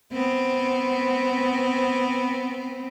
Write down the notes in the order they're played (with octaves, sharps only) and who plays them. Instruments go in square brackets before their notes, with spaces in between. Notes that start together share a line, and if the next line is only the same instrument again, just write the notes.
[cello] B3 C4